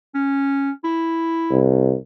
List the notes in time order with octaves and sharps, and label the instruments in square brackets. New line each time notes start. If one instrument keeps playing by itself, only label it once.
[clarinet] C#4
E4
[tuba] C2